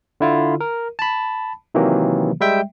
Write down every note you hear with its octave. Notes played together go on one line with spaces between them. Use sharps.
D3 E4 F4
A#4
A5 B5
C3 D#3 E3 F#3 A#3
G3 G#3 E5 G5